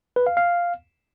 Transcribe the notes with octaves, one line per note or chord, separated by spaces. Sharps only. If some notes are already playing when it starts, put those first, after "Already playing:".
B4
F5
F5